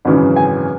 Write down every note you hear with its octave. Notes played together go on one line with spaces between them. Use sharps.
G#1 F#2 C#3 E3
G#5